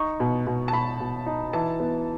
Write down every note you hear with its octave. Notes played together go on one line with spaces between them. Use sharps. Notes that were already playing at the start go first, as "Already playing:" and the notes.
Already playing: D#4 C#6
B2
B2
A5
B2 B5
B2
D#4
E3 A5
B3